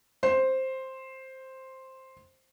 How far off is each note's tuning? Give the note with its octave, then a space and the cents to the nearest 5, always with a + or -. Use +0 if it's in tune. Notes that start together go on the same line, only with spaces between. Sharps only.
C5 +5